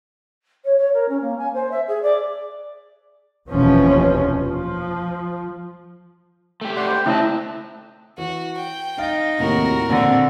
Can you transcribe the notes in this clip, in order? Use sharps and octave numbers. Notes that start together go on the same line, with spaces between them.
C#5
C#5
A#4
C#4
A#3
G#5
C5
E5
G#4
D5
F1 D#2 B2 E3 F3 C#4
F3
A3 G4
D5 F#5 C6
C5 G5 B5
C#3 A3 C4 E4 D#5 E5 A5
E3 F#4
G5
D#4 F5 A6
D#2 A2 C3 F#4 A#4
A#2 D3 C4